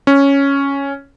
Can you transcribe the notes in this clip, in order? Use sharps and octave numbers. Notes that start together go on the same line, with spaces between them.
C#4